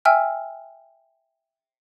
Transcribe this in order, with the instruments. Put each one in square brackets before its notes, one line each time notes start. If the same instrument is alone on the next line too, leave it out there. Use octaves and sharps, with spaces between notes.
[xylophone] E5 G5 G#5 E6 F6